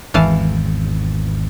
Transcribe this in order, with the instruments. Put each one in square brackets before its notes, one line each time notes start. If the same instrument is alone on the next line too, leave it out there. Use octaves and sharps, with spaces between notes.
[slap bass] G#1 E2 [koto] E3 F5 A5